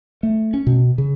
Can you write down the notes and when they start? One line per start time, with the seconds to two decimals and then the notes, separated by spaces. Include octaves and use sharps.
0.23 A3
0.54 C#4
0.67 B2
0.98 C#3